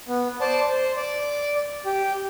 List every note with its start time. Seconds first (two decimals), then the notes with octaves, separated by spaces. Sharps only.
0.08 B3
0.41 C5 D5 A5
0.71 C5
0.96 D5
1.86 G4